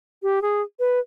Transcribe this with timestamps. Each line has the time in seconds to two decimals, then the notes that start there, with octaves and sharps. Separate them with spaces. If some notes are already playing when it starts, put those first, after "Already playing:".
0.23 G4
0.42 G#4
0.80 B4